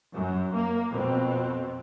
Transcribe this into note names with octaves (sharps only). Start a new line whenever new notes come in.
F#2
A#3
F2 B2 C4